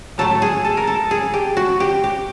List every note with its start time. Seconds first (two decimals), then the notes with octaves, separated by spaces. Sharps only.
0.18 A2 F#3 A3 A4
0.42 G#4
0.65 A4
0.77 A#4
0.87 A4
1.11 G#4
1.34 G4
1.57 F#4
1.80 G4
2.04 G4